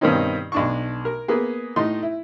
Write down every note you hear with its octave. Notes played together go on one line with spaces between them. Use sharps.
G2 B2 D#3 C4 C#4 D#4
B1 D4 C#6
A#4
A#3 B3 G#4
A2 D#4 C6
E4